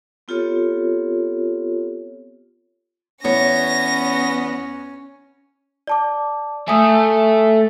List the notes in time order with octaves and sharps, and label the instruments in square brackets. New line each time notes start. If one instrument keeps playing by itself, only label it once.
[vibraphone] B3 C4 F4 G4 A4 C#5
[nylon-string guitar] E2 C#5 [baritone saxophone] B3 [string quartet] C#4 [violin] A#6
[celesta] D5 A5 D6
[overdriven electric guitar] A3 A4 [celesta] G#5 D#6